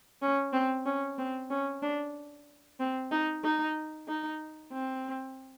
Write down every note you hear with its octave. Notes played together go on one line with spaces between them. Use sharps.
C#4
C4
C#4
C4
C#4
D4
C4
D#4
D#4
D#4
C4